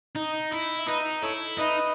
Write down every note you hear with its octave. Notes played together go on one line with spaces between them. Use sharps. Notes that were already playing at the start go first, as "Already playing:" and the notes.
D#4
E4
E5
D#4 B4 D#5
E4 A4 C#5
D#4 B4 D#5